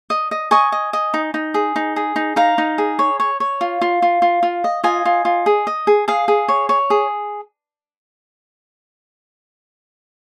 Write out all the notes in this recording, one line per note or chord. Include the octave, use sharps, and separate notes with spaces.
D#5
D#5
D#5 G#5 C#6
D#5
D#5
D#4
D#4
G#4
D#4
G#4
D#4
D#4 F5 A#5
D#4
G#4
C#5
C#5
C#5
F4
F4
F4
F4
F4
D#5
F4 D#5 G#5
F4
F4
G#4
D#5
G#4
G#4 F5
G#4
C#5
C#5
G#4